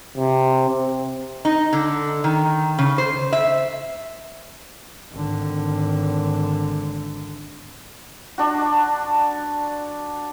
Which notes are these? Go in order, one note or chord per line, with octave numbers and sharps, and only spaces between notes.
C3
C4
D#4
D3
D#3
C#3
C5
E5
G#1 D3
D4 F#4